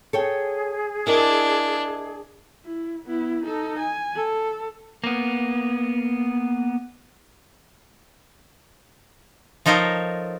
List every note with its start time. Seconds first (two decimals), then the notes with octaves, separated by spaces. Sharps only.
0.13 G#4 A4 C#5 G5
1.07 D4 E4 A#4 D#5
2.65 E4
3.06 B3 E4
3.44 D#4 A4
3.80 G#5
4.16 A4
5.04 A#3 B3
9.66 F3 D#4 A4 A#4 C5 C#5